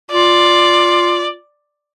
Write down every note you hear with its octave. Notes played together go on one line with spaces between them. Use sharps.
F4 D5